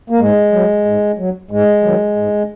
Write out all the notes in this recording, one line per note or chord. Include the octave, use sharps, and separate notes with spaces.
A#3
G#2 G#3
F#3
G#2
F#3
G#2 G#3
D#3 F#3
G#2